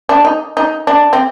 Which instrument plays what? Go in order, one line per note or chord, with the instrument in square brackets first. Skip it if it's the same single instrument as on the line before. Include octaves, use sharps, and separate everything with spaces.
[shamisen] D4
D#4
D#4
D4
C4